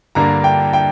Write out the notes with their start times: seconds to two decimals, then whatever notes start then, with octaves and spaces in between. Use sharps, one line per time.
0.15 G2 D3 A#3 D4 A#5
0.44 G5
0.73 G5